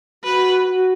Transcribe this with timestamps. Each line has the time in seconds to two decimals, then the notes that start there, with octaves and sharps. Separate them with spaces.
0.23 F#4 B4
0.64 F#4